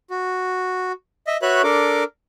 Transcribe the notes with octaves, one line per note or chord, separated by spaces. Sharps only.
F#4
D#5 E5
F#4 B4 C#5 E5 F#6
D4 A4 A#4 D6